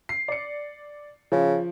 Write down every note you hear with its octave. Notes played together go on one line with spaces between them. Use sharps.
C7
D5 C#7
C#3 F3